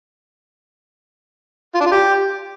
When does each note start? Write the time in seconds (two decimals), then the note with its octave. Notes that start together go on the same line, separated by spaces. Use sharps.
1.75 F4
1.80 D4
1.86 F4
1.92 G4